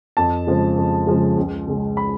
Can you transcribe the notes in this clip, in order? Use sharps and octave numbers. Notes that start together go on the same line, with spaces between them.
F2 A5
C#3 F3 G#3
F2
C#3 F3 G#3
C#2
C#3 G#3 C#4
B5